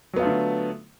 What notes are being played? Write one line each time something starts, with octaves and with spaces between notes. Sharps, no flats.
D3 F#3 A3 B3 F4